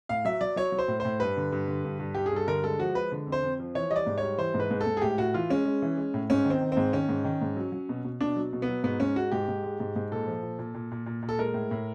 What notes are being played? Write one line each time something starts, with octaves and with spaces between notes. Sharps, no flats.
A2 F5
F#3 E5
F#3 D5
F#3 C#5
F#3
C5
A2
C5
A2
G2 B4
D3
G2
D3
G2
G2
G2 G4
G#4
G2 A4
D3 A#4
G#3 A4
F3 F#4
G#3 B4
D3
F2
C5
F2
F3
E3 C#5
G3 D#5
D5
G#2
C#5
G3
E3 C5
G#2
B4
G#2
A4
G#2
G#4
A2 G4
A2 F#4
E3 F4
G#3 C#4
G#3
E3
G#3
A2
G#2 C#4
D#3
C4
D#3
G#2 C4
D#3 C#4
G#2
D#3
G#2
F#3
F#3
B2
B2
B2 D4
F#3
B2
B3
F#3
G#2 B3
G#2 C#4
G#3 F#4
G#2 G4
G#2
G#3
G#2
G#2
A#2 A4
F3
A#2
A#2
A#2
A#2
A#2
A#2
A4
G#3 A#4
A2
A2